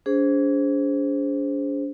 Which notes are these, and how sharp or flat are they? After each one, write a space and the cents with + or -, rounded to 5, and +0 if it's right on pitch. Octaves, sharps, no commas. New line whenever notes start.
D4 -45 G#4 +0 C5 +0